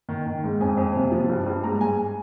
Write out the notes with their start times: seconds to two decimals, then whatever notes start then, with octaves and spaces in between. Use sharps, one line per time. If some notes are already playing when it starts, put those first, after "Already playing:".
0.09 D#3
0.26 D#3
0.44 G#2
0.60 F2 G#5
0.77 F2
0.96 C3
1.12 F3
1.30 G2
1.46 G2
1.64 G#2 A#5
1.81 G#2 G#5